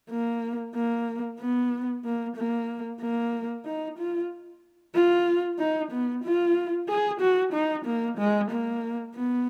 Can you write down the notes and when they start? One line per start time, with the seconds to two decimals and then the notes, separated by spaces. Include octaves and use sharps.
0.11 A#3
0.75 A#3
1.40 B3
2.05 A#3
2.37 A#3
3.01 A#3
3.66 D#4
3.98 F4
4.95 F4
5.59 D#4
5.92 B3
6.24 F4
6.89 G#4
7.21 F#4
7.53 D#4
7.86 A#3
8.18 G#3
8.51 A#3
9.15 B3